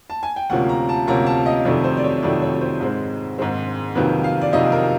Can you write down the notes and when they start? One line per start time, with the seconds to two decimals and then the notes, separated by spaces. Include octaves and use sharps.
0.10 A5
0.23 G#5
0.36 G5
0.50 D2 C3 F3 A#3 C#4 F#5
0.69 A#5
0.89 A5
1.07 D2 C3 F3 A#3 C#4 A#5
1.26 A5
1.46 D#5
1.65 F2 C3 D#3 F#3 A3 D5
1.84 C5
1.97 D5
2.04 C#5
2.23 F2 C3 D#3 F#3 A3 D5
2.42 C#5
2.61 C5
2.80 G#2 D#3 G#3 C4
3.38 G#2 D#3 G#3 C4
3.95 F2 C3 D#3 F#3 A#3 B4
4.24 F5
4.41 D5
4.53 F2 C3 D#3 F#3 A#3 D#5
4.72 A#4